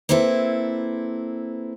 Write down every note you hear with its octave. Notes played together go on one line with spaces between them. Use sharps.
A#3 C4 E4 A4 B4